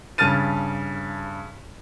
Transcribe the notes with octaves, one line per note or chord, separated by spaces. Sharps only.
G2 C#3 A5 F6 A6 D#7